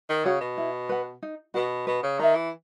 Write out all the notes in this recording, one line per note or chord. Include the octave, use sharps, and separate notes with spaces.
D#3
C#3 F#4 C#5 F#5
B2
E4
B4 F#5
D#4
B2 F#4 B4
B2 B4
C#3
D#3 E5 A#5
E3